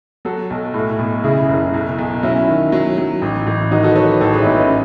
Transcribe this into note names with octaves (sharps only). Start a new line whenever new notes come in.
F#3 F#4 A4
B1
A2
B1
C#3 E4 G#4
F#1
B1
B1
F#3 C#4 E4
D#3
F#3
F#3
A1
A1
D#3 D#4 F#4
F#4 A4
B4
F#3 A4 C#5
A1 A4 C#5
G#4 B4
E4
A1 B3 D#4
C#4